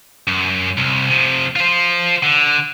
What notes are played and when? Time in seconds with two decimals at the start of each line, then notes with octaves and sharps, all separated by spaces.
0.27 F#2
0.78 C2
1.10 C3 F3
1.56 F4 C5
2.23 D3